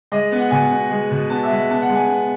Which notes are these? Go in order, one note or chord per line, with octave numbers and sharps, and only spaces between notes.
G#3 D#5
B3
F#5
B2 G#5
B3
G#3
B2
B3 A5
E5
G#3
B3 A5
F#5
G#3
G#5
B3